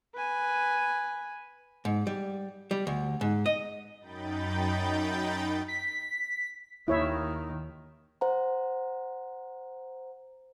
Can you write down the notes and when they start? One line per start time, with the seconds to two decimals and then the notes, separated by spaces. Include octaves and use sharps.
0.14 B4 G#5
1.85 G#2
2.07 G3
2.71 G3
2.87 D2
3.21 G#2
3.46 D#5
4.01 F#2 D#4 G5 B5 G6 A6
5.68 B6
6.88 D#2 D#3 E4 C#5 E5
8.21 C5 F#5 A#5